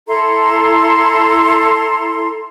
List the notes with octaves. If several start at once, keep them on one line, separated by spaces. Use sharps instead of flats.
E4 A4 A#5 C6